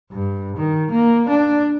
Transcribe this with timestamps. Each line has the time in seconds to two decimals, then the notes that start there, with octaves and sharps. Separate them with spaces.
0.12 G2
0.57 D#3
0.91 A#3
1.29 D4